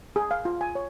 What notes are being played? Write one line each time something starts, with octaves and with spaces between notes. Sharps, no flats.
G#4
F5
F4
G#5
C#5